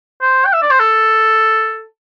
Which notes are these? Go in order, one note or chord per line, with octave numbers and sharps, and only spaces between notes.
C5
G5
E5
D5
C5
A4